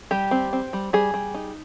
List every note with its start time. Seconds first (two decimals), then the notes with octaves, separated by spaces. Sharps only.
0.11 G3 G4
0.31 C4
0.53 C4
0.73 G3
0.93 G3 G#4
1.14 G3
1.34 D#4